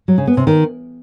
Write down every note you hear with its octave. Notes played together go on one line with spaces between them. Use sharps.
F#3
C#3
B3
C3
D#3